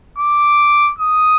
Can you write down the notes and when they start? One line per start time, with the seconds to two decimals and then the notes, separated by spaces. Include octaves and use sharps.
0.18 D6
0.99 D#6